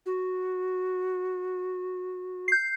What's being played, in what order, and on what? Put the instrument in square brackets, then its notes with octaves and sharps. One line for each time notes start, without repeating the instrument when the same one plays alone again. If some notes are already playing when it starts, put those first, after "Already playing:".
[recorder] F#4
[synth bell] G6 C7